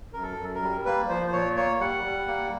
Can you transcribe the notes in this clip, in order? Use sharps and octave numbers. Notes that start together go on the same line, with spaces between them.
F#2 A#4
A4
F#2
A#4
G3
A#3 B4
F3 C5
C5
A#2 C#5
A#3 C#5
G3 F#5
G3
A#3